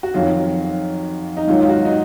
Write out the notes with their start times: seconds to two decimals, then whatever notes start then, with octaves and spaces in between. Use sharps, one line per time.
0.03 F#4
0.14 F2 D#3 F#3 F4
1.37 D#4
1.47 G#2 D#3 F#3 F4
1.61 F4
1.69 F#4
1.85 D#4